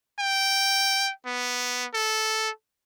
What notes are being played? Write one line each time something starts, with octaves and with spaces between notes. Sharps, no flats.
G5
B3
A4